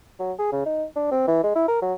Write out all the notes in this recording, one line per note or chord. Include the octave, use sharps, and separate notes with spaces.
F#3
G#4
C#3
D#4
D4
C4
E3
G#3
E4
A#4
F#3